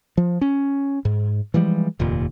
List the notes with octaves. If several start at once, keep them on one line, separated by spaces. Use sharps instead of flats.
F3
C#4
G#2
E3 F3 G3 G#3
F1 D#2 A#2